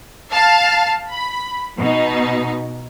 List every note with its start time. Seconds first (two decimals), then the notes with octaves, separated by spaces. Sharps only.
0.32 F5 A5
1.10 B5
1.78 B2 D#4